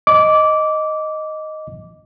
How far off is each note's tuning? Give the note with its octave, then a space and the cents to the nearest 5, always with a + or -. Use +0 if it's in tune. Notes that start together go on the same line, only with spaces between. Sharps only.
D#5 +0 D6 -15